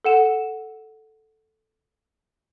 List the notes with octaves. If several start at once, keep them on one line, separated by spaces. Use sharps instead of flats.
A4 F#5 E7